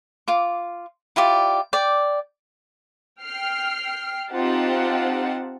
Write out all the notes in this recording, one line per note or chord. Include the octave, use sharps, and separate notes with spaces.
F4 D6
E4 F4 G4 D5
D5 G5
G5 F6 C7
C4 D#4 F4 G4 F#5 A5